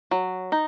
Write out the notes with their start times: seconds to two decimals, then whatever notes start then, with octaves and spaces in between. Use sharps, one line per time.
0.11 F#3
0.52 D#4